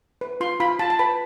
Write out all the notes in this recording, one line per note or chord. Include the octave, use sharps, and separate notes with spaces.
B4
F4 C6
F4 B5
F4 A5
A5
B4 B5